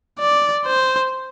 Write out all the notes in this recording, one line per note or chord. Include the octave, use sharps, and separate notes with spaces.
D5
C5